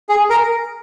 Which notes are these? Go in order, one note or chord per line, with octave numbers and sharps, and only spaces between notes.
G#4
A#4